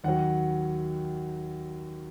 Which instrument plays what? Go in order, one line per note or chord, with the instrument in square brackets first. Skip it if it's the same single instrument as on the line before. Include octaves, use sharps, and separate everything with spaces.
[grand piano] D#2 D#3 F#3 F#5